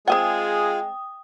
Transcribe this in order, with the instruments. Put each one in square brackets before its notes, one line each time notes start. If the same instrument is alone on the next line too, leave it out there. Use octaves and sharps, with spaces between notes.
[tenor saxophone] G#3 [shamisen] C4 D#5 F#5 [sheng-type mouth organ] F4 G#4 [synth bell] G5 D#6